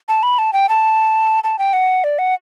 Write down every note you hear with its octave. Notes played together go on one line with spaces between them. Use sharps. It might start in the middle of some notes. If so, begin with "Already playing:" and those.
A5
B5
A5
G5
A5
A5
G5
F#5
D5
F#5